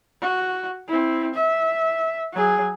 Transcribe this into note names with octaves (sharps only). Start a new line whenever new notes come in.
F#4
C4 E4
E5
F#3 G#4